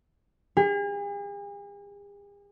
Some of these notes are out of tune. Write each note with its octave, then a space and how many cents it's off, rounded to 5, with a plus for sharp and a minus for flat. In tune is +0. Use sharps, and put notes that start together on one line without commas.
G#4 -45